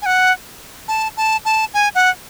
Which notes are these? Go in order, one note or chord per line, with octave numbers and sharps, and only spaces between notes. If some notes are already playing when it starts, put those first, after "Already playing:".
G#5
F#5
A5
A5
A5
G#5
F#5